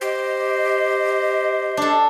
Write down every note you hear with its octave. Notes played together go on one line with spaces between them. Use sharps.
G4 C5 D#5
D4 A4